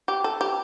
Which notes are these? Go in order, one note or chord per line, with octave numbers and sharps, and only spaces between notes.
G4
A4
G4